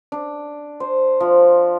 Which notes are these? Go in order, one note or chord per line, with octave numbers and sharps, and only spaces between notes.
D4
C5
F3